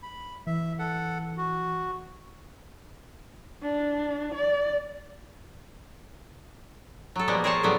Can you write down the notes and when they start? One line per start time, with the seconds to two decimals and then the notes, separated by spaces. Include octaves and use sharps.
0.03 B5
0.47 E3 E5
0.79 A4 F#5
1.37 F#4
3.62 D4
4.34 D5
7.16 F#3 A4
7.28 A#2 F3 G3 G#3 A#3 B3
7.44 G#4 A#4 C5 C#5 G#5 A5
7.63 A2 C#3 F#3 G3 B3